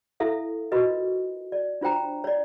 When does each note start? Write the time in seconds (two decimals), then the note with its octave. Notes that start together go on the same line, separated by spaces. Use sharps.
0.20 E4 A4 E5 F5
0.72 F4 F#4 A#4 B4 D#5
1.52 D5
1.81 D4 F4 C5 G5 A#5
2.24 C#5 D5